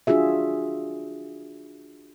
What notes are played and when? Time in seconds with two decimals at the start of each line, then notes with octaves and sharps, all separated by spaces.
0.07 D4 F4 F#4 G#4 E5